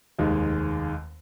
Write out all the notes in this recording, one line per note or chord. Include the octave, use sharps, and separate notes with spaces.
F1 D#2 D#3 G#3